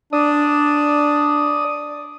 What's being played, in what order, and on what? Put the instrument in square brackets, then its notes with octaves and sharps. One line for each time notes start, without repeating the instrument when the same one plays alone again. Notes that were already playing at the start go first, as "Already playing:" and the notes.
[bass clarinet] D4 [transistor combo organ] D5 D#6